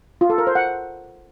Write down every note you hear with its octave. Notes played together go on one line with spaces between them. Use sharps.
F4
A4
A#4
C5
F#5